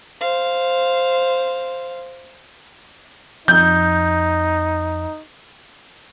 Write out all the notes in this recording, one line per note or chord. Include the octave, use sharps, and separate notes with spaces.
C5 F5
F2 D#4 G6